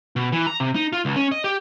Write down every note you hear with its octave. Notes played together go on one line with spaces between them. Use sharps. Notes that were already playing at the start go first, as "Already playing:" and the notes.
B2
E3
A#5
C3
D#4
F4
C#2
C#4
D#5
G4